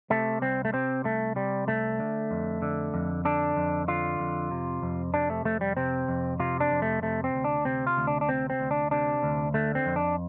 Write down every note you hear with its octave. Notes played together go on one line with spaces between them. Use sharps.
C3 A3
C2 C4
A3
C3 C4
C2 A3
C3 G3
C2 A3
D3
F2
D3
F2
D3 D4
F2
D3 F4
F2
C3
F2
C3 D4
A3
F2 A3
G3
C3 C4
F2
C3 F4
D4
F2
A3
C3 A3
C4
D2
D4
C3 C4
F4
D2
D4
D4
C3 C4
C4
D2
D4
C3 D4
D2
D3 A3
C4
F2
D4